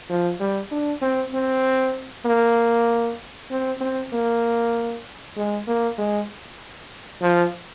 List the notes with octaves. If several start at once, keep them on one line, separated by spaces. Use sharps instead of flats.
F3
G3
D4
C4
C4
A#3
C4
C4
A#3
G#3
A#3
G#3
F3